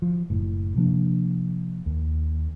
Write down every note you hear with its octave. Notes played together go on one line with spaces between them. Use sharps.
F3
F#1 A2
C3 F3 A#3 D4
D#2